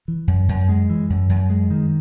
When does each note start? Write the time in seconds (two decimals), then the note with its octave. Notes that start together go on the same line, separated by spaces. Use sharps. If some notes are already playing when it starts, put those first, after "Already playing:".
0.08 E3
0.27 F#2
0.49 F#2
0.69 G#3
0.90 E3
1.10 F#2
1.29 F#2
1.50 G#3
1.71 D#3